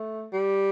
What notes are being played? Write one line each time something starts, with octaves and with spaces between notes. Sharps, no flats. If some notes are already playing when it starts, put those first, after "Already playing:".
Already playing: A3
G3